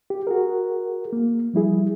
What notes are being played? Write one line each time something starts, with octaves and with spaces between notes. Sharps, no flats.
G4
F#4 G#4 A#4
A#3
F3 G3 E4 G#4